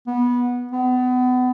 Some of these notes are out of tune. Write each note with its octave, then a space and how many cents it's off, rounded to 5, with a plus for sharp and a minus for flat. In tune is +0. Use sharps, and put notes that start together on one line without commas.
B3 -15
B3 +30